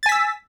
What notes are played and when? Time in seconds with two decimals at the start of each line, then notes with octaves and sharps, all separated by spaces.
0.03 A6
0.06 G#5
0.09 B6
0.12 E6